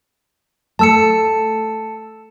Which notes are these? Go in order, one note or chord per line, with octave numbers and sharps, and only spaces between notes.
A3 A5 E6 C#7